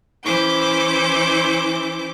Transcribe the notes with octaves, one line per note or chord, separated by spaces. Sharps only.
E3 C#4 E4 C5 D6 G6